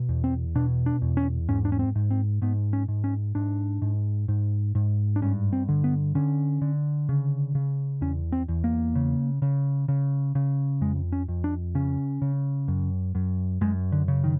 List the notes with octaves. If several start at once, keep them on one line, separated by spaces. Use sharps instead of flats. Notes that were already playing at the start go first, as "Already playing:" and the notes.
Already playing: B2
E2
C4
B2 D4
D4
E2
C#4
G#2 C#4
D4
C#4
C4
G#2
C4
G#2 B3
C#4
G#2
C#4
G#2 D4
G#2
G#2
G#2
D4
G2 C#4
C4
D3
B3
D3 C#4
D3
C#3
C#3
E2 C#4
C4
E2
A#3
C#3
C#3
C#3
C#3
F2 G#3
C#4
F2
D4
C#3 C#4
C#3
F#2
F#2
F#2 G#3
D3
C#3
D#3